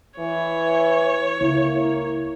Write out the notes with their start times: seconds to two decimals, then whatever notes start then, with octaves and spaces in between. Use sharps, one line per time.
0.19 E3 C#5
1.41 C#2 A#3 E4